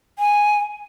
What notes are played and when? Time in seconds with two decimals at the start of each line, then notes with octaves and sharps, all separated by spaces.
0.19 G#5